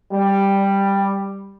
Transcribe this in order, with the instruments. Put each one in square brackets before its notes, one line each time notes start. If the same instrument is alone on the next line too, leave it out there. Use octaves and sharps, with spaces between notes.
[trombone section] G3